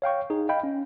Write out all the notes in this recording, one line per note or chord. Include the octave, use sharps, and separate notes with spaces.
C#5 F5 G5 C#6
D#4 G#4
D#5 F5 G5 B5
C#4